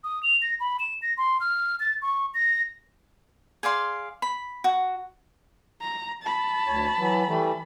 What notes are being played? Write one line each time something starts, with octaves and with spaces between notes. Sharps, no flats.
D#6
F7
A#6
B5
E7
A#6
C6
F6
A6
C#6
A#6
G#4 D5 F5 C6
B5
F#4
A#5
A5 B5
D2 C#5
E3 F#3
E3 G3 A3